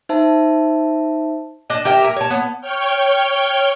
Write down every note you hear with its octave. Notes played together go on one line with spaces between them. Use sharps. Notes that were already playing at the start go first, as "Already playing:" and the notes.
D#4 C5 E5 A5
D4 D#5 A5
G4 A#4 E5 G5
A#4
C#5 A5
B3
C#5 G5 C#6 F6 G6